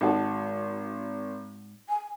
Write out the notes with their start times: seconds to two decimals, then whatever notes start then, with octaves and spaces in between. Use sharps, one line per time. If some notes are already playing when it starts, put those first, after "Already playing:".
0.01 G#1 G#2 D#4 F#4 A4
1.89 G#5